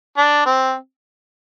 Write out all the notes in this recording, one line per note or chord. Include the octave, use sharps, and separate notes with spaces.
D4
C4